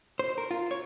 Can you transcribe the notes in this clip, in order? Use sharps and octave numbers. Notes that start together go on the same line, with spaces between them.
C5
A#4
F4
C#5